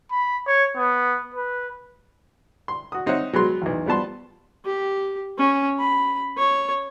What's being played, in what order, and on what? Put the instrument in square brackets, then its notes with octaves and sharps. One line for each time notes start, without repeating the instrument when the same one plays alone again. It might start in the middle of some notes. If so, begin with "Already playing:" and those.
[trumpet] B5
C#5
B3
B4
[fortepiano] C6
F#4 D#6
C4 D#4 C5 C#5 E5 F#5
F#3 G#3 B3 C6
B1 E2
F3 G3 B3 A5 C6
[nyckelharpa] G4
C#4
B5
C#5